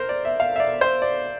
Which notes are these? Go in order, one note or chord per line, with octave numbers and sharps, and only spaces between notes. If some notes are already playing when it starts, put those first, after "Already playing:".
Already playing: A#4 C5
D5
E5
F5
E5
D5
C5
D5